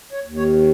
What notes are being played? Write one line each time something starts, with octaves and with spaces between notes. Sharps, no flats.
C#5
D#2
C#5